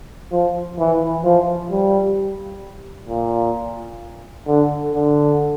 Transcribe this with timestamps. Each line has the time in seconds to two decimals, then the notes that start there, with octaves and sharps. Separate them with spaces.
0.31 F3
0.79 E3
1.24 F3
1.71 G3
3.09 A#2
4.47 D3
4.94 D3